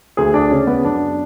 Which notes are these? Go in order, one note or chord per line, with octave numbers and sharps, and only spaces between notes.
D2 G#4
D4
C#3 C#4
B3
F#2 D4